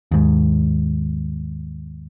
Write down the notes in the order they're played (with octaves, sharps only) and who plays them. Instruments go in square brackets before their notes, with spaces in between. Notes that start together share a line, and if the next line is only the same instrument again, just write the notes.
[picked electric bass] D#2 G#2